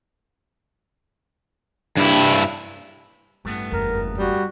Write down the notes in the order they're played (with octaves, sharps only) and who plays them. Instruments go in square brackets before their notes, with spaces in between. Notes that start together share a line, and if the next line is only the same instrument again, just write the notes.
[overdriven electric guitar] G2 E4
[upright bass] A1 [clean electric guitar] G2 A3 B3
[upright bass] F#1 E2 [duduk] A#4
[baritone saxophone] G3 [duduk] F#4